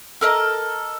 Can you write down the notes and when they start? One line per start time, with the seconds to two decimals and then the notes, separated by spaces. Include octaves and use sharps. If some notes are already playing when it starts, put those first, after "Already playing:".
0.21 A4 A#4 D#5